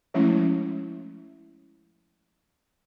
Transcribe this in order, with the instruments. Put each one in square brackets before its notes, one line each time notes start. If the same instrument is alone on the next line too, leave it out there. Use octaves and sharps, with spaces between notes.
[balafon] F3 G#3 A3 C#4 E4